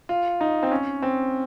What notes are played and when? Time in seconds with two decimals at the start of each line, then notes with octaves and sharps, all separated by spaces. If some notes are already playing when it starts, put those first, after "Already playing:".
0.09 F4
0.41 D#4
0.63 C4
0.71 C#4
1.02 C4